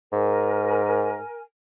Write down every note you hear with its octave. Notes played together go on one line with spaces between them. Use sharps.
G#2 A#4 G#5